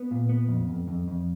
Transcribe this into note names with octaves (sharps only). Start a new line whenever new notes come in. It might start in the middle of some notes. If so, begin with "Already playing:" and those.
Already playing: B3
A#2
B3
F2
F2
F2
F2